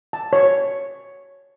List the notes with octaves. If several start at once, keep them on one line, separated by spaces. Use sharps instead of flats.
A5
C#5